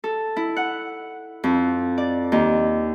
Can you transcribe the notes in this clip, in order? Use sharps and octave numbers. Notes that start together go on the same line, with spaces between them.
A4
E4
F#5
F2
D5
D#2